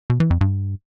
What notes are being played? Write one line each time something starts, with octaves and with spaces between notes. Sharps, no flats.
B2
E3
F2
G2